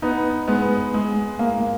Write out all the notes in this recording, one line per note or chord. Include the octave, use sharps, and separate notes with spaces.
B3 D#4
G#3 B3
G#3
A#3